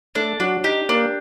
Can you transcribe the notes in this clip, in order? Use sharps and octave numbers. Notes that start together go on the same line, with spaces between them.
A3 D4 A4
F#3 D4 F#4
D#4 G4 D#5
A#3 D4 A#4